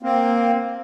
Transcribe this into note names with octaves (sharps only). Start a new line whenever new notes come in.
A#3 C4